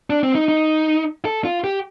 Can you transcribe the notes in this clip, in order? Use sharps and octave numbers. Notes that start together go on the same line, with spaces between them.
D4
C4
D#4
D#4
A4
F4
G4